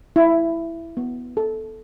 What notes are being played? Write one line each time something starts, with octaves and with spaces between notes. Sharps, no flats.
E4
B3
A4